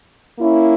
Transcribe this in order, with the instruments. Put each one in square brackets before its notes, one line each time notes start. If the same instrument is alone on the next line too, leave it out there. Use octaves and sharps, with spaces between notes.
[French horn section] A#3 C#4 E4